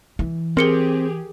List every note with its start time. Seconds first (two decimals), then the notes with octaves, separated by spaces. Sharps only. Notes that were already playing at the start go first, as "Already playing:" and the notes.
0.19 E3
0.57 C4 G4 G#4 A#4 C#7 G7